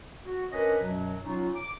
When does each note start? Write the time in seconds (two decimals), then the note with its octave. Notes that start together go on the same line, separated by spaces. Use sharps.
0.25 F#4
0.52 C#4 D4 A#4 B4 C#5 D#5
0.80 F#2 B2 F#3
1.23 F#3 C#4 D#4 F4
1.55 D6